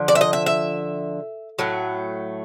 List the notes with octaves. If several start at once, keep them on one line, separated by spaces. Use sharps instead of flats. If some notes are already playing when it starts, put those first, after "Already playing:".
Already playing: D3 F3
D5
E5
D#5
E5
E5
A2 F#3 A3